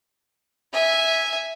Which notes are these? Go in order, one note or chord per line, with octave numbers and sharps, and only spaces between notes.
E5 G#5